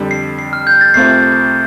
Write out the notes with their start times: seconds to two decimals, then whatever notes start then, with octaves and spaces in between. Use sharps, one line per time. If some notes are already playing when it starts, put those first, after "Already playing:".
Already playing: F2 D3 G3
0.11 C7
0.39 C7
0.53 F6
0.67 G6
0.81 A6
0.94 C2 C3 A3 C4 F4 C7